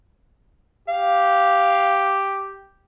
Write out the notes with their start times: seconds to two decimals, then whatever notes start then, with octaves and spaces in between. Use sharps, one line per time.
0.88 G4 F5